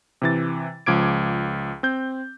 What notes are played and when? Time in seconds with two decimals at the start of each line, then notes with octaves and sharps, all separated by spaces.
0.22 C3 E3 A6
0.86 C#2 F3 D6 G#6 D7
1.83 C4 G6